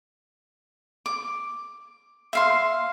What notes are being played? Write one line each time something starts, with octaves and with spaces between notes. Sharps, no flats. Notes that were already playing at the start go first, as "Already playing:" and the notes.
D6
E5 F5 C6